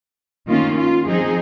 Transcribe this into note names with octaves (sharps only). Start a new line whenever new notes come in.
D#3 A#3 C#4 F4
F4
F3 C4 D#4 G#4